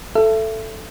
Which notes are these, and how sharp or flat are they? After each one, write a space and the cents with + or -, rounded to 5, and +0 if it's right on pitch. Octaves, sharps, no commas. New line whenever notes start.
A4 +0 E5 +25